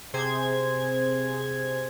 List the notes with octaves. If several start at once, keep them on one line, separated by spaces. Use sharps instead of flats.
C3 G#4 C5 G#6